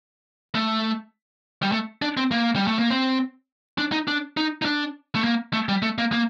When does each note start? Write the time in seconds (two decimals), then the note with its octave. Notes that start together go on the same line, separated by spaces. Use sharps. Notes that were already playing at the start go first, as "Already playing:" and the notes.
0.55 A3
1.63 G3
1.72 A3
2.02 D4
2.17 C4
2.32 A#3
2.56 G3
2.68 A3
2.79 A#3
2.90 C4
3.78 D4
3.92 D#4
4.08 D4
4.37 D#4
4.62 D#4
4.65 D4
5.15 A3
5.24 A#3
5.53 A3
5.69 G3
5.82 A3
5.98 A#3
6.12 A#3